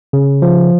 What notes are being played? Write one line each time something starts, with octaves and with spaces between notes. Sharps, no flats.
C#3
F3